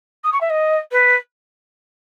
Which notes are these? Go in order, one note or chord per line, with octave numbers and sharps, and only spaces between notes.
D#6
C#6
E5
D#5
B4